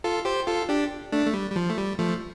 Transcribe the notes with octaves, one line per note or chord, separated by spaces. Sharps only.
F4 A4
G4 C5
F4 A4
D4 G4
A3 D4
A3
G3
G3
F3
A3
G3
F3 A3